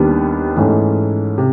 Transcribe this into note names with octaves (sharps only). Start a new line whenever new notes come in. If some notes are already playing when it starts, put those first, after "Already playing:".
Already playing: D#2 D#3 G3 B3 D4
G#2 E3 A3 C#4
C3